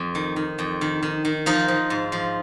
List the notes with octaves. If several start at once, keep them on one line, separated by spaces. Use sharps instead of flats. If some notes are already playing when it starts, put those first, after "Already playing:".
Already playing: F2
D#3
D#3
F2
D#3
D#3
D#3
F3 D#4
F3
G#2
F3